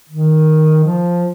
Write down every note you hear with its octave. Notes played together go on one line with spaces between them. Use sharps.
D#3
F3